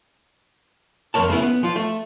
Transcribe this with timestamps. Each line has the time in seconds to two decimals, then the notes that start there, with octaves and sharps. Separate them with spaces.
1.14 F2 G#2 A#4 C#5 A5
1.28 C#3 A3 B3 E4
1.42 B3
1.63 F3 F4
1.76 A3